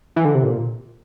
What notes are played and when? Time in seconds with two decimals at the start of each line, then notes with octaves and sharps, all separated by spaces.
0.16 E3
0.25 D3
0.35 C3
0.43 A#2